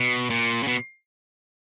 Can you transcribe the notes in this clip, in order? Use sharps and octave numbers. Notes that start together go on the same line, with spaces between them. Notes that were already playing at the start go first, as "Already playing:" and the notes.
Already playing: B2
A#2
C#3
B2